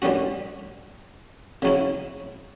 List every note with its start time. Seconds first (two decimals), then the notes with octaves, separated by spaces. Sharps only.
0.02 D2 D3 G3 C#4 F#4
1.62 C#3 F#3 C#4 E4